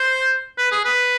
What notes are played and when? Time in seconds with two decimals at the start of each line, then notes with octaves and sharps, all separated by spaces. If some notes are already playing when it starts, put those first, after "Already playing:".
Already playing: C5
0.58 B4
0.72 G#4
0.85 B4